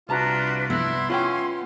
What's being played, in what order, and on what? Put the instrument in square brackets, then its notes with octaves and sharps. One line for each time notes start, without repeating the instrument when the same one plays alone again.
[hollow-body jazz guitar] C2 A5 A#5 [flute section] D4 F#4 B4 [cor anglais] F4
[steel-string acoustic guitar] B3 [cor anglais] E4 [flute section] C6
[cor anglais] C#4 [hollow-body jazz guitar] F4 F#5 G5